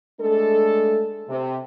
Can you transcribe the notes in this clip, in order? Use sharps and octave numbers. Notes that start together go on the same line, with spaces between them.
G#3 A3 D4 A4
C3